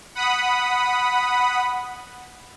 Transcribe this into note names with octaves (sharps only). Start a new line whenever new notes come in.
F#5 B5 D#6